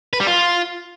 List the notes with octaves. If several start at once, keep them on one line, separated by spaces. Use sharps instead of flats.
B4
G3
F4